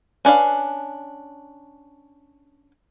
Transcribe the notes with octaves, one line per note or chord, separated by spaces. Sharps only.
C#4 D4 B4 F5